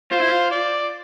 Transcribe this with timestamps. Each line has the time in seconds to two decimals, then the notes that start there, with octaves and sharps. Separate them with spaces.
0.12 F4 C5
0.20 E4
0.29 F4
0.51 D5